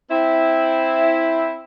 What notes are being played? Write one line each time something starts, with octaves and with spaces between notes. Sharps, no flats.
C4 E4